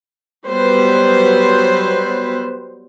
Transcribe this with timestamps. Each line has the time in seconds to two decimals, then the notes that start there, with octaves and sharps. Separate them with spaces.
0.48 F#3 G3 B3 B4 C5